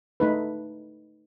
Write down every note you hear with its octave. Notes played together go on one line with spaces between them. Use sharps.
A3 D#4 B4